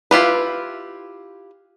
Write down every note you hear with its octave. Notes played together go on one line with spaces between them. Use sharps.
E4 F4 G4 B4